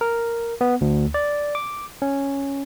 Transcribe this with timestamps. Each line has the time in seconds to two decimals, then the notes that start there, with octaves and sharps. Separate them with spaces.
0.01 A#4
0.61 B3
0.81 D2
1.14 D5
1.55 D6
2.02 C#4